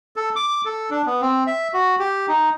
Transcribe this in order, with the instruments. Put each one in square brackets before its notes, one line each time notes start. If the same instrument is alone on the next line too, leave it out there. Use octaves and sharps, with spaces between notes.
[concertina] A4
D6
A4
D4
B3
C4
E5
F#4
G4
D#4